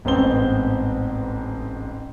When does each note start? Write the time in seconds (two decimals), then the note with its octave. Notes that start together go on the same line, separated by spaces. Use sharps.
0.05 A1 G#2 B3 C4 G7